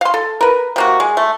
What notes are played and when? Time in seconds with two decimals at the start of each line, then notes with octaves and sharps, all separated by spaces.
0.01 F5 C6
0.14 A4
0.41 A#4 B4
0.76 C3 A#3 F#4
1.00 G#3
1.17 A3